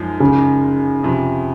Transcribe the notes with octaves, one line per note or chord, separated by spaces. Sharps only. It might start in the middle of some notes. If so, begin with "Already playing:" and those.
Already playing: F#2 F3 G#3 D#4
C#3
F2 C3 F3